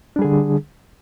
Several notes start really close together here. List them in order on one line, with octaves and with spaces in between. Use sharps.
D4 G3 G#4 D3